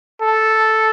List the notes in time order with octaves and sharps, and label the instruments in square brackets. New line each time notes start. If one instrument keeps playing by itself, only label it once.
[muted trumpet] A4